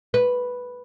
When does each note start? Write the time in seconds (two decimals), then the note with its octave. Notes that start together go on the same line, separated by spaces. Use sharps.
0.14 B4